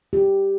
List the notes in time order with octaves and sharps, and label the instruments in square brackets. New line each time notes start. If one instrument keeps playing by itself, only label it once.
[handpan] G4